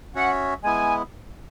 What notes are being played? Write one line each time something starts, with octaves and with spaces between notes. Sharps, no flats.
C#4 F#4 C#5 E5 F#5
G#3 B3 E4 G#5